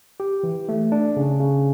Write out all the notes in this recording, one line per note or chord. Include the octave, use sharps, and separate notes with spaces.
G4
E3
A3
D4
C#3
C#3